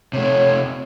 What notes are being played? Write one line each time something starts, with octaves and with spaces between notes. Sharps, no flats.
C3 A3 C#5